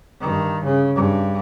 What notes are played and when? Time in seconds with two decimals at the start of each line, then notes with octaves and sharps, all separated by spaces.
0.21 G2 D#3
0.64 C#3
0.95 G2